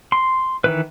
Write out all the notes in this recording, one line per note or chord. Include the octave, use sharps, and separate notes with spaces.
C6
D#3 E3 B4